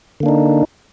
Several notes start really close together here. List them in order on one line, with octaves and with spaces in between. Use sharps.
D3 A#3 D4 D#4